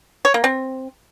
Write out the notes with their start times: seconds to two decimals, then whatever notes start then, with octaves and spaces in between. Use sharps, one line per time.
0.25 C#5
0.34 A#3
0.44 C4